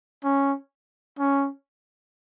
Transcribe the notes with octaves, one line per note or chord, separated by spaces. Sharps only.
C#4
C#4